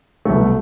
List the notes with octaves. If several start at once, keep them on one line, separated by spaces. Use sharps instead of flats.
C2 B2 A3